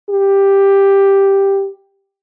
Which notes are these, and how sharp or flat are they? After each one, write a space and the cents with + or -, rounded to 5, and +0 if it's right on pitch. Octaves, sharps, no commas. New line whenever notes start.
G4 +5